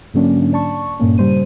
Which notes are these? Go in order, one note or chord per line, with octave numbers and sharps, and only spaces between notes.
G#2 D3 F#3 A#3 C#4 D4
D5 A5 C#6
G2 A#2 A#3 C#4
C#3 G3 C5 D#7